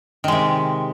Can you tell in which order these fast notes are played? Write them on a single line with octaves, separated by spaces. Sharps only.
D#3 G#3 C3